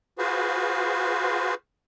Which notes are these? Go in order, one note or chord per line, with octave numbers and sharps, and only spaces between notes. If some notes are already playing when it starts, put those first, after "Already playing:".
F4 F#4 G#4 B4 C5